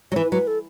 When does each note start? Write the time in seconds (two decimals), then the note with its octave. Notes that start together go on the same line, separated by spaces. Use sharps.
0.12 F#3 C#5
0.16 E3 B4
0.32 F#3 B4
0.47 A4